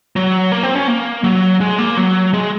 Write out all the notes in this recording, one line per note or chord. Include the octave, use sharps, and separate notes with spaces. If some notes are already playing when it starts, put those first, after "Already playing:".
F#3
A#3
C4
C#4
A#3
F#3
G#3
A#3
F#3
G#3